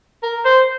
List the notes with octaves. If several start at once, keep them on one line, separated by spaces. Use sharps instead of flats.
A#4
C5